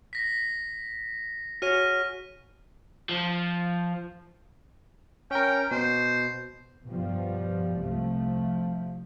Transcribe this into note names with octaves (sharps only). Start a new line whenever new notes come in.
A#6 B6
F#4 G#4 C#5 F6 A#6 D#7
F3
C#4 A#4 G5
B2 C5
G2 B2 F3 G3
C2 F3 A3